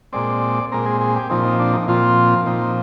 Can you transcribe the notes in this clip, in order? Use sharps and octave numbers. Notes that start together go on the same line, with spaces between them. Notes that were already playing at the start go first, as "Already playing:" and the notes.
A#2 G#3 C4 D5
A#2 G#3 C4 A#4
G#4
G#4
G4
A#2 F3 C4 D#4
D#4
D4
D#4
A#2 F3 C4 F4
A#2 F3 C4 D#4